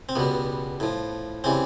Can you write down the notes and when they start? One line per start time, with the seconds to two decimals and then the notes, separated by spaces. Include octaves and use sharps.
0.09 C4
0.16 C#2 B2 G3 B3
0.80 A2 F3
1.44 C#3 E3 G3 C4